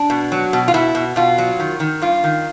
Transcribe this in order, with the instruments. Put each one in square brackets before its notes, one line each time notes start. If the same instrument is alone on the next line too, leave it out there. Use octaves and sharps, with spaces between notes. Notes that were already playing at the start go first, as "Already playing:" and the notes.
Already playing: [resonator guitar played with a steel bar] D4
B2
F#3
B2
F4
B2 E4
B2
B2 F4
F#3
D#3
D#3
G2 F4
D#3